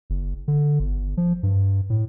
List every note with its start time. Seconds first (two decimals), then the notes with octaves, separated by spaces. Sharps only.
0.10 F#1
0.48 D3
0.79 G1
1.17 F3
1.43 G2
1.90 A2